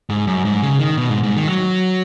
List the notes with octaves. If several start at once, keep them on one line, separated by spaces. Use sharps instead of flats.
G#2
F#2
G#2
C#3
D#3
B2
G#2
G#2
D#3
F#3